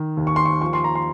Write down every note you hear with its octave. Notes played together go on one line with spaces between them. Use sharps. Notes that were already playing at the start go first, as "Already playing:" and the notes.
Already playing: D#3
D#2
C#6
C6
C#6
F3 C#6
C6
A#5
C6